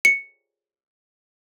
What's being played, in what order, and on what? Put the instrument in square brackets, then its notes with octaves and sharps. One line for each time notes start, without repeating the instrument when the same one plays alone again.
[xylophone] C#7